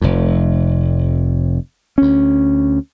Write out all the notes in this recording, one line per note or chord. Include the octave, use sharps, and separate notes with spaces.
F1 F2
D2 C#4